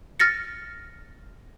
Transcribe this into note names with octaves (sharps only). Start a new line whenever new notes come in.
F6 A6 A#6 C#7